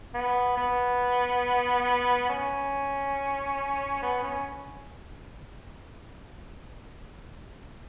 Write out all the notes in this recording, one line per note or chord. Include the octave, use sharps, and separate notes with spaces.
B3
B3
C#4
B3
C#4